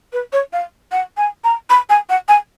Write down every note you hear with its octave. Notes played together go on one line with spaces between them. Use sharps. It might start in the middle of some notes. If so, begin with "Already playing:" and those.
B4
C#5
F5
F#5
G#5
A#5
B5
G#5
F#5
G#5